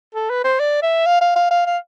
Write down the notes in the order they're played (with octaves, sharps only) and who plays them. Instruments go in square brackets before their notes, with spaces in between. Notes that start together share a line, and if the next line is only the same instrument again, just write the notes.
[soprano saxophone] A4
B4
C5
D5
E5
F5
F5
F5
F5
F5